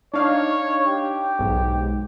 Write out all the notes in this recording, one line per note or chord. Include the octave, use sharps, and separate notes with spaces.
D4 D#4 C#5 F5
G4
B1 G#2